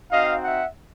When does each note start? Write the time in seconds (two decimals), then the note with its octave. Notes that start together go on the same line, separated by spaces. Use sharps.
0.11 C4 D#4 F#4 D#5 F5
0.43 E5 F#5